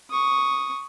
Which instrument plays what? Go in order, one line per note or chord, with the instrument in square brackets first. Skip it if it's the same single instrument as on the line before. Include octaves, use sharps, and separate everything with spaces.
[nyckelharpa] C#6 D#6